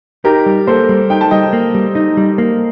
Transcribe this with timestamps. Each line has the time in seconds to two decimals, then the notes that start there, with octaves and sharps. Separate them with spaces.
0.25 D#4 G4 A#4
0.46 G3
0.67 A#3 A4 C5
0.89 G3
1.10 D#4 G5
1.21 A5
1.31 G3 D#5 G5
1.53 A#3
1.75 G3
1.95 D#4
2.17 G3
2.38 A#3